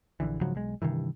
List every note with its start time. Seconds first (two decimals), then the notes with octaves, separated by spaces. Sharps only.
0.20 A#1 D3 E3
0.41 G#2 C#3 F3 F#3
0.55 B1 G#3
0.82 G2 C3 D#3 E3